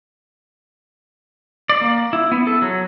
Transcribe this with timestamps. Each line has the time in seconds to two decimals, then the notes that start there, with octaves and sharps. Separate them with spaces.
1.70 D5
1.81 A#3
2.13 E4
2.32 B3
2.47 A4
2.62 F#3